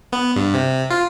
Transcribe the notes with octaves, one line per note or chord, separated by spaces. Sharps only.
B3
G2
C3
F4